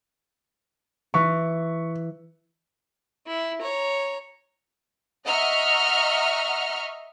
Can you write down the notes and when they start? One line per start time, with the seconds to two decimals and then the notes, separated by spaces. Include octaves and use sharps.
1.14 E3 C#6
3.27 E4
3.62 C#5 A#5
5.27 D#5 E5 F#5 A#5 C#6 F6